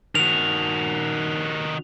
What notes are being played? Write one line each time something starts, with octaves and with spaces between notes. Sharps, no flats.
D#3 F#4 F7